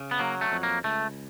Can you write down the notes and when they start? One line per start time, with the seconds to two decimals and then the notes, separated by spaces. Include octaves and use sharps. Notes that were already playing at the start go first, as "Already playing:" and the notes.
Already playing: C#3
0.11 B3
0.19 F#3 A#3
0.41 A3
0.52 F2
0.63 A#3
0.84 C#2 A3